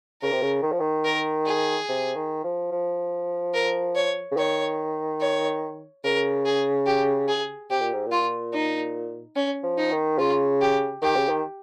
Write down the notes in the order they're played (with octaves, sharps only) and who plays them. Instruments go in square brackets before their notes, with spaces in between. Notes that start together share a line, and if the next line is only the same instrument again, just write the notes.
[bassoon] C#3 [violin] A#4
[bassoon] C3
C#3
D#3
F3
D#3
[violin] A#4
G#4
[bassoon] C3
D#3
F3
F3
[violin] A#4
C#5
[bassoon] C#3
[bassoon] D#3 [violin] C#5
[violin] C#5
[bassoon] C#3 [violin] A#4
[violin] G#4
G4
G#4
[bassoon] C3 [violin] G4
[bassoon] A#2
G#2
A#2
[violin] F4
D#4
C#4
[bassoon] F3
[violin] D#4
[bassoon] D#3
[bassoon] C#3 [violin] F4
[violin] G4
[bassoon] D#3 [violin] G4
[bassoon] C#3
D#3